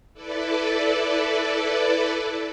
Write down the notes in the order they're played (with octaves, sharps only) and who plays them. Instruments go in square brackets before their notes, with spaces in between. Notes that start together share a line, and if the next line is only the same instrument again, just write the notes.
[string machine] E4 A4 B4 D5